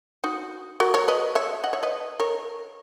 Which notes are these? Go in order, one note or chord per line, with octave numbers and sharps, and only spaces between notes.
D#4 F#4
F#4 A#4
A#4 C#5
B4 D#5
C#5 E5
D#5 F#5
C#5 E5
B4 D#5
A#4 C#5